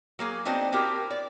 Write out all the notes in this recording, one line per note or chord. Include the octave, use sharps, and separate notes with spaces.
F#3 A#3 G#4
B3 C4 D4 D#4 F#4 C5
C4 E4 F#4 G4 A#4
D5